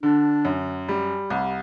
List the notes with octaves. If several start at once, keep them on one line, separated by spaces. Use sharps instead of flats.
D3 D4
F#2
G3
C2